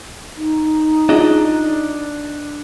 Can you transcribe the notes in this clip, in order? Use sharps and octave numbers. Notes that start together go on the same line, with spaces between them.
D#4
D4 E4 F4 G#4 D#5